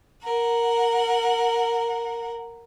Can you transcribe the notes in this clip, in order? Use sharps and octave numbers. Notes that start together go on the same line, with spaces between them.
A#4 F#5